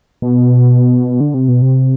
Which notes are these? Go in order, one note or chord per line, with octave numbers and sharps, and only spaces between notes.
B2
D3
C3
B2
C3